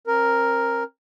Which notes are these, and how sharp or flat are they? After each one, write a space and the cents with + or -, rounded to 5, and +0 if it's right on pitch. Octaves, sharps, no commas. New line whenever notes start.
C4 +40 A#4 +0